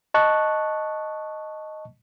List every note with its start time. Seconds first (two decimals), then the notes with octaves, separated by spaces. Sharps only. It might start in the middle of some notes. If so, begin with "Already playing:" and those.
0.14 D#5 A5 C#6 F#6